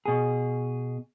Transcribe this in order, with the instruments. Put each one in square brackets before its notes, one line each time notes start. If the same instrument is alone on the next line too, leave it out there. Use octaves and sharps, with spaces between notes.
[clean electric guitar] B2 G#4